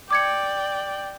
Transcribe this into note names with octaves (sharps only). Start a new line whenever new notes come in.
D5 G5 D6 G#6 C#7